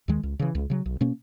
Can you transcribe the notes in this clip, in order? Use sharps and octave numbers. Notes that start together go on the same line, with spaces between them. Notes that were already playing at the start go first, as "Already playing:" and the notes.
D#2 D#3 G#3
C#2
C#3 E3
C#2
C#3 F#3
B1
B2 A#3 C#4